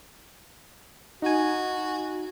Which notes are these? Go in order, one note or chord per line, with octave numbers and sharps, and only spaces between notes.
D#4 F#4 G#5